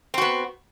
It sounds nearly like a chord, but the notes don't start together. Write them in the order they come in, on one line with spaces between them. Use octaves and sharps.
C4 F#4 B3